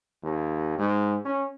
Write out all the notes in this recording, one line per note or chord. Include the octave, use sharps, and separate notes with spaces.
D#2
G#2
C#4